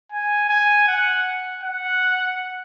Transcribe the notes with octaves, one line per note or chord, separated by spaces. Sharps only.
G#5
G#5
F#5
F#5